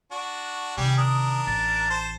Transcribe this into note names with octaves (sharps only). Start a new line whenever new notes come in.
D4 F#4
C3 D#3 G3 G4 G#4
D4 A#4 D#6
A1 A6
C5 A5